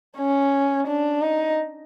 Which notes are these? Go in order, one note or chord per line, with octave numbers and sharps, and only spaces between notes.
C#4
D4
D#4